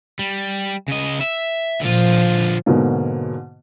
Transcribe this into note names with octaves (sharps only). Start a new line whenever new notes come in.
G3
C#3 D#5
E5
A#2 D3 F3 F4
G#2 B2 D3 F#3 A#3